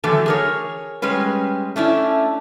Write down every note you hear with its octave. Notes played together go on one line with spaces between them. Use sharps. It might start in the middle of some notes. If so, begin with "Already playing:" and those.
D3 E3 F#3 A3 A4
G#4 A#4 C#5
G3 G#3 C#4 B4
A3 C#4 D4 E4